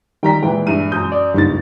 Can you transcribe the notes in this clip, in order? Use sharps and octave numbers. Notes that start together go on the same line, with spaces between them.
D#3 G3 G5 A#5 B6
A#2 E3 G#3 B4 G5
G2 E4 D#7
F#2 D#6 G6
D5
F#1 C#2 G2 D#4 A6